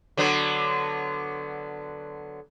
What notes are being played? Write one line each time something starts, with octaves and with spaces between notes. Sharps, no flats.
D3 F#3 B3